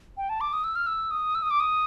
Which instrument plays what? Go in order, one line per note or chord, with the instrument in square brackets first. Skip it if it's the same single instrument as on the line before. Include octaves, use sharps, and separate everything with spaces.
[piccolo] G5
A5
D6
D#6
E6
F6
E6
D#6
E6
D#6
D6
D#6